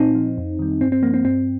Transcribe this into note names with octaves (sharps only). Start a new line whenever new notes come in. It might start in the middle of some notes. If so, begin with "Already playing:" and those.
Already playing: A#2 C4 D#4
F3
F2
D#3 G3
G2 C4
C4
F3 A#3
C4
G2 C4